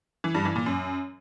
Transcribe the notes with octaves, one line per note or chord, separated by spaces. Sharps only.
E3
G2
E3
A#2
F#2